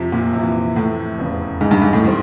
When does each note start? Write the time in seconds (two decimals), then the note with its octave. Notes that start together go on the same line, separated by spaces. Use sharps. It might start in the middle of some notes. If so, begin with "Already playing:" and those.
Already playing: F2 C3 F3
0.12 A#2
0.33 F2 C3 E3
0.76 A2
1.18 F1 E2 C#3
1.61 G#2
1.71 G2
1.82 G#2
1.93 A2
2.04 D#3 G3 C4